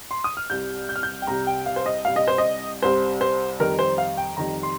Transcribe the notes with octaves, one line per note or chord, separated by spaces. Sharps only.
C6
D#6
F6
C2 C3 G3 G6
G6
F6
G6
G5
C2 C3 G3 A#5
G5
F5
C5
D#5
C2 C3 G3 F5
D#5
C5
D#5
C2 C3 G3 C5
C5
F2 D#3 G3 A#4
C5
F5
G5
F2 D#3 G3 A#5
C6